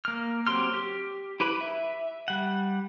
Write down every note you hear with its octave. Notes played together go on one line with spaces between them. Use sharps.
A#3 F6
F#3 C4 G4 C6 F6
G4
E4 G4 B4 B5
E5
G3 F#5